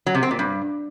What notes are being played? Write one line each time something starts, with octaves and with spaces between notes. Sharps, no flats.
F#3
C3
C4
A#2
G2